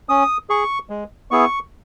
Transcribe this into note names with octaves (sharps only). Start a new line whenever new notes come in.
C#4 D#6
G#4 C#6
G#3
B3 E4 G#4 C#6